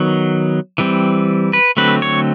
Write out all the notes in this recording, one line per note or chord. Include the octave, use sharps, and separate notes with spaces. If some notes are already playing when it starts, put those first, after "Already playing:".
Already playing: D#3 F#3 B3
E3 G3 C4
B4
D3 F#3 A3 C4 B4
C#5